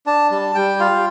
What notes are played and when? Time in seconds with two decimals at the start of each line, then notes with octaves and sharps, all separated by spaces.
0.06 D4 A5
0.31 G3 A5
0.55 G3 G5
0.80 F4 F5